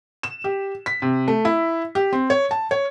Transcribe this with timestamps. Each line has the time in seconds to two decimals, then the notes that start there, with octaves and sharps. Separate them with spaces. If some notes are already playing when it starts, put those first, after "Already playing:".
0.23 E7
0.44 G4
0.86 B6
1.02 C3
1.28 A3
1.45 E4
1.95 G4
2.13 C4
2.30 C#5
2.51 A5
2.71 C#5